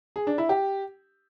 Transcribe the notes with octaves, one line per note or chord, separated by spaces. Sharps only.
G#4
D4
E4
G4